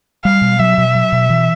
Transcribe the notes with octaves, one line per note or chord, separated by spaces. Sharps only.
G3 F5
B2
F#3 E5
B2
F#3
B2
E3